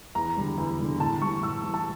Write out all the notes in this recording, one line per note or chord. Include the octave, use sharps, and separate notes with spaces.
E2 A#5
D3 G3
E2
D3 G3
A2 A5
E3 G3 C#6
A2 E6
E3 G3
A5